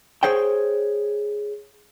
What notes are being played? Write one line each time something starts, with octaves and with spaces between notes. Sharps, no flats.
G#4 C5 C#5 G5